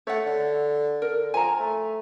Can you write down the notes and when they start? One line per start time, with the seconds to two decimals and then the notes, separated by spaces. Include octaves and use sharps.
0.07 A3 C#5 F#5
0.26 D3
1.02 D3 A#4
1.34 F3 G#5 A#5
1.59 A3